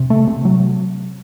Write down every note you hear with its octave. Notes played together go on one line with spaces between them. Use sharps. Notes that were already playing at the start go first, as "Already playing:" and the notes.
Already playing: C3
A3
C3
F#3